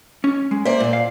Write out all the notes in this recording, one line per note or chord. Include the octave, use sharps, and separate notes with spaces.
C#4
G#3
A#3 C5 D5 E5
A#2
F5